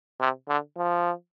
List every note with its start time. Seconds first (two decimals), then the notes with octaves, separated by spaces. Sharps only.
0.20 C3
0.49 D3
0.77 F3